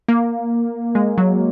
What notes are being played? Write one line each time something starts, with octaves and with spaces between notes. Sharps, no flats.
A#3
G#3
F#3